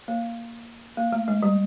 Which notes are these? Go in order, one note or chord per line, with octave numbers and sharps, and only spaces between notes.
A#3
A#3
A3
G#3
G3